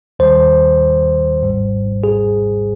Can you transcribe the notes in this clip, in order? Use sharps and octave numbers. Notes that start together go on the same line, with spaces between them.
D#2 D#3 G3 C5
G#1 G#2 G3
G#4